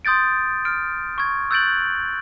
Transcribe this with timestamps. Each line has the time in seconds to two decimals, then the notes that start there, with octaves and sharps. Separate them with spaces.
0.05 C6 D#6 G6 A6 D7
0.65 F6 D7
1.18 C#6 G#6
1.51 E6 F#6 G6 A6 D7 F#7